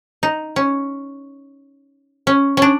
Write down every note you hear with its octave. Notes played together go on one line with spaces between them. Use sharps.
D#4
C#4
C#4
C#4 D4